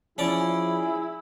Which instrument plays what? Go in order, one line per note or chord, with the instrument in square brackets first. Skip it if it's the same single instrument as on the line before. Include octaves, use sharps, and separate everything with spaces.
[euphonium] F3 [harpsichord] C#4 D5 [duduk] E4 [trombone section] G#4